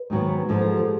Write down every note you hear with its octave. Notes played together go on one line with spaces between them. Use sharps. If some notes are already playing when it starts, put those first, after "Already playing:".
Already playing: B4
G#2 D#3 F#3 B3
G#2 F3 G#3 A4
G#4
G4